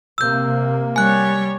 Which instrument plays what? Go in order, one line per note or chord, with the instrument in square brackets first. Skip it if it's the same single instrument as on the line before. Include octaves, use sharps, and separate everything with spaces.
[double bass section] C3 A#3 [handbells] E6 G6
[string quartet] G3 C#5 [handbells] G#5 F#6